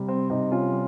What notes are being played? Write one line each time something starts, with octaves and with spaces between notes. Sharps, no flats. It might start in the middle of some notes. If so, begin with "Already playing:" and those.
Already playing: C3 G3
C4
C3 C4 D#4
C#4 F4
G3